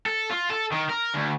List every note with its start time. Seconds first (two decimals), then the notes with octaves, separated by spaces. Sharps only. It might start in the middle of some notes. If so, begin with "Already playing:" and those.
0.06 A4
0.30 F4
0.50 A4
0.72 D#3
0.90 A#4
1.15 D2